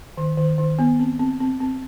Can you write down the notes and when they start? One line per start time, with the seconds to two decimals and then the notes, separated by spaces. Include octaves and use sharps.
0.17 D#3
0.37 D#3
0.58 D#3
0.79 B3
0.99 C4
1.19 C4
1.40 C4
1.60 C4